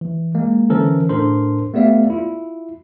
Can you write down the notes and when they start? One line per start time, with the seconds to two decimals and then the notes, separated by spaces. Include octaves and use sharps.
0.01 E3
0.35 G#3 A#3
0.69 D3 E3 C#4 A4 A#4 C5
1.09 A2 D4 A4 A#4 C5 C6
1.74 A3 B3 G4 D5 E5 F5
2.10 E4 F4